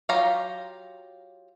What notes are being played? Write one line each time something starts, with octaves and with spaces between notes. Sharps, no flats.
F#3 F4 G4 F5 A#5